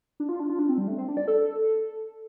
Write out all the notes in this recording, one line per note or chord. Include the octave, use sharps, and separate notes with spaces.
D4
F4
D4
F4
D4
C4
G3
A3
C4
D4
D5
A4